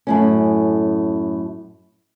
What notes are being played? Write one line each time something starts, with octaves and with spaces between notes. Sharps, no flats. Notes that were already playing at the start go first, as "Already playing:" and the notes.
F#2 A2 C#4